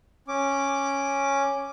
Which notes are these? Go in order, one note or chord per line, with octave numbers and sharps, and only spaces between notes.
C#4 D6